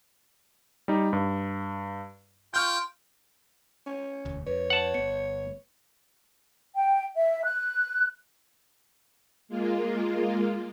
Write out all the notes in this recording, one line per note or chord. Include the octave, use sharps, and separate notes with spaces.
G3 D#4
G2
F4 G5 C#6 F6 G6
C#4
E1 D2
F2 B4 C#5
F#5 A5
G1 B3 C#7
G5
E5
F#6
G#3 A#3 F4